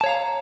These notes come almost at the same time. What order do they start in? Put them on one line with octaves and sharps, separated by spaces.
A5 C#5 F5 A#5